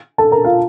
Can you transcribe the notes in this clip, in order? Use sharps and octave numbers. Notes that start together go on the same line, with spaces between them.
A4 A5
A#4 A#5
F4 F5